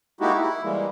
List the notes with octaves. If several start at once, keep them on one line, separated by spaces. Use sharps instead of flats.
G#3 A#3 D#4 E4 F#4 G4
E4
E3 G3 G#3 A#3